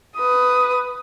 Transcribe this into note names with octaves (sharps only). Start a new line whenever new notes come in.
B4 D#6